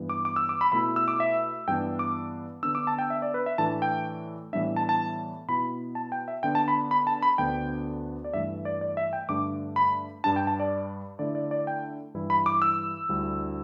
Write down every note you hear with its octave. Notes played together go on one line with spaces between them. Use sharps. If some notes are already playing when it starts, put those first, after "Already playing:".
Already playing: G2 E3 B3
D6
D6
E6
D6
B5
B2 A3 E4 B5
E6
D6
E5
G2 E3 B3 D4 G5
D6
D3 B3 D4 E6
D6
A5
G5
E5
D5
B4
E5
A2 E3 A3 D4 A5
G5
A2 E3 G3 B3 D4 E5
A5
A5
B2 B3 E4 B5
A5
G5
E5
D3 B3 D4 G5
A5
B5
B5
A5
B5
D2 D3 B3 D4 G5
D5
G2 E3 A3 E5
D5
D5
E5
G5
G2 D3 A3 D4 D6
B5
G2 G3 D4 A5
G5
A5
D5
D3 A3 E4 D5
D5
D5
G5
G2 E3 G3 E4
B5
D6
E6
D2 D3 G3 E4